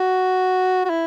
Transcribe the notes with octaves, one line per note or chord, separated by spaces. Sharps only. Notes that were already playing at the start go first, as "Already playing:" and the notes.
Already playing: F#4
F#4
E4